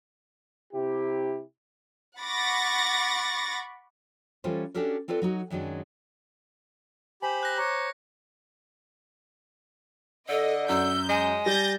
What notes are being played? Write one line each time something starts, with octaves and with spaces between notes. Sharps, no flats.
C3 E4 G4
F#5 B5 C#6 D6 A6 A#6
E3 G3 C#4 F4 A4 C5
C#4 D4 F#4 G4 A4 A#4
C4 F4 A4 B4 D5
F#3 D#4 F#4
F#2 D#3 F#3 G#3 D4
G4 C5 G#5 B5
F#6 A#6
C#5 A#5 D6
D3 A4 D#5
F#2 E6 G6
G#3 G#5
G3 G6 A6 A#6